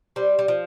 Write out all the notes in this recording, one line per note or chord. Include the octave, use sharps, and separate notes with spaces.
G3 C4
G3
F3